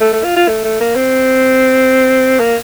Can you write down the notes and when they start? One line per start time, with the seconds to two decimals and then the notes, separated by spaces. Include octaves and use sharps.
0.01 A3
0.13 A3
0.24 F4
0.36 F4
0.48 A3
0.64 A3
0.80 A#3
0.96 C4
2.39 A#3